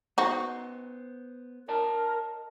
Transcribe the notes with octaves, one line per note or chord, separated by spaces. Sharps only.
B3 D#4 F#4 C5
A#4 C#5 D#5 A5